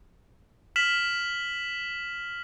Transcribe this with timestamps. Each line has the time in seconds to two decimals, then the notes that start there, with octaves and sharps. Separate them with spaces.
0.76 F6 B6 E7 F#7